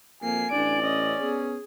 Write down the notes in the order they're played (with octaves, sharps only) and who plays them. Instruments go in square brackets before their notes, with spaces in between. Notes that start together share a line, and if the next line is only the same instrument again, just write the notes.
[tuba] F2 [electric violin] A#3 C7 [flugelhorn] G#5
[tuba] A1 [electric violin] D4 D7 [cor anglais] D5
[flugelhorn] C#4 [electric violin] D#5
[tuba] B3 [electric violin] G#4